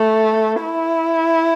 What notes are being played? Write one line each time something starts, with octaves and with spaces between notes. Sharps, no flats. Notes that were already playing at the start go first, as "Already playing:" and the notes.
Already playing: A3
E4